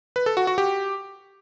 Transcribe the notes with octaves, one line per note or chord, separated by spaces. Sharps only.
B4
A4
F#4
F#4
G4